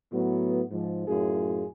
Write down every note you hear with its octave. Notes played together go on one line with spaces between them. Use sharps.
A2 F#3 B3
G#2 F3
F#2 A2 F4 G#4